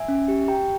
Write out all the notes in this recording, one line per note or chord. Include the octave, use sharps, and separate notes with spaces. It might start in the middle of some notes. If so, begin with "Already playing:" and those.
Already playing: E5 G#5
C#4
G4
G4 G5 A#5